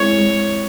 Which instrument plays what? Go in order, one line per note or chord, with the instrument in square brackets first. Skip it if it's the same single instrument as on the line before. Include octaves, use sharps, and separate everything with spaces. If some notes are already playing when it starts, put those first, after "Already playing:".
Already playing: [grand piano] G#3 C4 E4 [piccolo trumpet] C#5
[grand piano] G#3